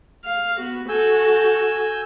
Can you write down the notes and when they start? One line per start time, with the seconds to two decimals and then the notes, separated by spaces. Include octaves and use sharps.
0.25 F5
0.59 B3 F#4
0.89 F#4 A4 G#5 E6 G6